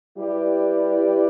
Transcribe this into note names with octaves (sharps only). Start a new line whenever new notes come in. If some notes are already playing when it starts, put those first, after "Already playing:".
G3 E4 G4 B4 D5